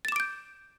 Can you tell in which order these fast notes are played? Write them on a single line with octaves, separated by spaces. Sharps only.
A6 E7 D6 D7 G6